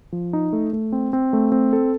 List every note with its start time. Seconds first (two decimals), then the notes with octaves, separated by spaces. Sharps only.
0.12 F3
0.33 D#4
0.53 A3
0.73 A3
0.92 C4
1.13 C4
1.33 A3
1.52 C4
1.73 A4